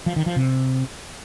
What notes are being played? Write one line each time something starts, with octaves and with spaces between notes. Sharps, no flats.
F3
D#3
F3
C3